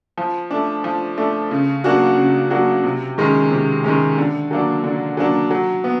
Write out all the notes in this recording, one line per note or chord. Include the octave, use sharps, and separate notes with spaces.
F3
A3 D4
F3
A3 D4
C#3
F#3 A#3 D4 F#4
C#3
F#3 A#3 D4 F#4
C3
D#3 G#3 C#4
C3
D#3 G#3 C#4
D3
F#3 A#3 D4
D3
F#3 A#3 D4
F#3
B3